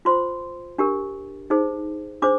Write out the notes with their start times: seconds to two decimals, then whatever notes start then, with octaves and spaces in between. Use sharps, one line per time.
0.05 F4 C5 C6
0.78 D4 G4 A#4
1.50 D#4 G#4 C5
2.22 D4 G#4 C5 D6